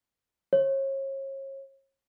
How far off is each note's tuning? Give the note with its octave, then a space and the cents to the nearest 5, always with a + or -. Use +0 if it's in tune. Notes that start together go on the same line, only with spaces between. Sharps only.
C#5 -35